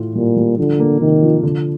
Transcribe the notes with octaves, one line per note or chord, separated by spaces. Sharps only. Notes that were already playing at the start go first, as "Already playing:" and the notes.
Already playing: A2 F4
A#2 G3
G3
D3 F3
A#3
C3 D#3
F3
D3